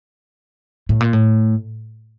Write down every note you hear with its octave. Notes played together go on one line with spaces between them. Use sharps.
A2
A#2
A2